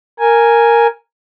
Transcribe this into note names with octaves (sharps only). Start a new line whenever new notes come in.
A#4 G#5